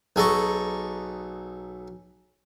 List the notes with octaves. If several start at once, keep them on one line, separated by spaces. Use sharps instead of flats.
B1 G#4 A4 A#5 C#6